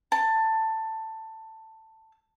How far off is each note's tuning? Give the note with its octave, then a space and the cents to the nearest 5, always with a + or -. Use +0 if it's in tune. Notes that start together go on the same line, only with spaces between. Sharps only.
A5 +15